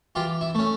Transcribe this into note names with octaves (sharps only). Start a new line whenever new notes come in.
E3 F4 G4
E4
A3 C#4